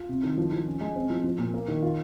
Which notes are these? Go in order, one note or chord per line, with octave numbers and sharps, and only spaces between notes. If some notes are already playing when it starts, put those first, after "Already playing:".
Already playing: F4
C3
D#3
F3
F3
C#4
G#3
C4
F3
F3
A#2
A#3
D#3
F4